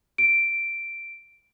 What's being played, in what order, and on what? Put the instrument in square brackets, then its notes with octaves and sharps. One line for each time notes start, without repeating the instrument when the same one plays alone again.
[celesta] D7